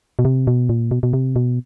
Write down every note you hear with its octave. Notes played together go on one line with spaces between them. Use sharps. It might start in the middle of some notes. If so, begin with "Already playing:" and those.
B2
C3
B2
A#2
B2
B2
C3
B2